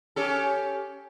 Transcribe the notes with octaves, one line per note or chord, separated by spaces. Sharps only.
C#4 G4 A4